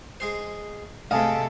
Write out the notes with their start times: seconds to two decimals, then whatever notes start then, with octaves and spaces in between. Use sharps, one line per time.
0.20 G#3 G#4 C5
1.11 C3 G#3 A3 A4 D#5 F5 G#5